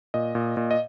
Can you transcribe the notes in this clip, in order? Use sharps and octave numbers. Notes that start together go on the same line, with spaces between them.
A#2 D#5
A#2
A#2
D#5